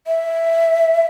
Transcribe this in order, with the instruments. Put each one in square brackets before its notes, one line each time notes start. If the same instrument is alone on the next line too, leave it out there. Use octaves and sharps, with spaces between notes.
[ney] E5